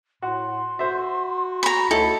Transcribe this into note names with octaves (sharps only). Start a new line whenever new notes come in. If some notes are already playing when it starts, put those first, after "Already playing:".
A2 F#4 C6
F#4 C5 E5
A#5 B5 C#6
D2 D#4 E4 A4 C#5